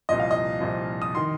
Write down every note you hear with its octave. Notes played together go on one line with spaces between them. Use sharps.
C2 A#2 F3 D#5
F5
D#5
C2 A#2 F3
D#6
D#3 C6